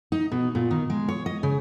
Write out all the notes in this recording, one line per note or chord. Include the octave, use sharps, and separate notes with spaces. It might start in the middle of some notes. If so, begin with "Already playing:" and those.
D#4
B2
A#2
D#3
G#3
C#5
D#5
C#3